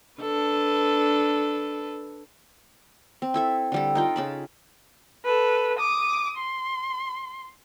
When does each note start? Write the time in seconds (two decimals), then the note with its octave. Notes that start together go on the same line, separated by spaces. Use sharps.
0.21 D4 A4 B4
3.22 C4
3.34 E4 A4 E5
3.72 D3 G3 A4
3.95 D#4 F4 G5
4.16 C#3 A5 B5
5.25 A4 B4
5.79 D6 D#6
6.38 C6